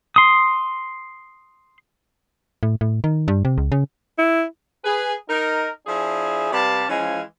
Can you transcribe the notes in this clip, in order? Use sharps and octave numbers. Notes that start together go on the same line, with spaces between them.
C6 D#6
A2
A2
D#3
G2
C3
C#2
C#3
E4
G#4 B4
D#4 A#4
F3 D4 E4 G#4
C3 G3 B4 D5 F5 A5
E3 F3 G#3 C#4 F5 G#5